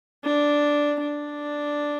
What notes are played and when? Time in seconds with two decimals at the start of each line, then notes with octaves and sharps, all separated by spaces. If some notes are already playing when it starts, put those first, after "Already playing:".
0.24 D4
1.00 D4